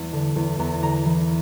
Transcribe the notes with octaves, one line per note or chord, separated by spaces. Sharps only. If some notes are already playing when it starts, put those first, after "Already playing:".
Already playing: E2 G3
D3
E2
E2 A#5
D3 A#5
E3